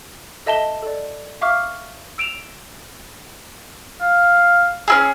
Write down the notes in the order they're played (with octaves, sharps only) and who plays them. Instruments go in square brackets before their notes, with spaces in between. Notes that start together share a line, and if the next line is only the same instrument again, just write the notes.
[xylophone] A4 D#5 E5 A5 E7 G7
A4 D5
E5 F5 C#6 D6 F6
E6 D7 E7 F7
[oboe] F5
[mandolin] C#4 E4 G#4